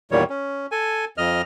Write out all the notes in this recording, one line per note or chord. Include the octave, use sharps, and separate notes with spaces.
E2 A#2 D#3 G3 C#5
C#4
A4 G#5
F2 D#5 F6